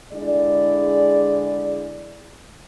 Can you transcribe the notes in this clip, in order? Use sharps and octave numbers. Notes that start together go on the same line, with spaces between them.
D3 G#3 E4 G#4 D5